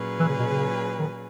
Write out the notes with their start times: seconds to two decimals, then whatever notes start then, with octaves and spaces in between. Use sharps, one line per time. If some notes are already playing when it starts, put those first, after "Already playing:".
Already playing: A#2 F#3 C#4 G#4 B4
0.20 E3
0.29 C#3
0.39 B2
0.50 C#3
1.00 D#3